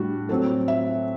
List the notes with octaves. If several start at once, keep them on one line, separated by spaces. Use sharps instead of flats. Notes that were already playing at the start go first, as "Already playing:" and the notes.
Already playing: A2 G3 D4 F#4
A2 F#3 C4 A4
E5